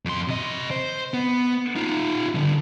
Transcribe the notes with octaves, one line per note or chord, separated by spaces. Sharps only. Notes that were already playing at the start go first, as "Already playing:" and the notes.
F2 C6
C3 D#5
C5
B3
D#4 F4
D3 G3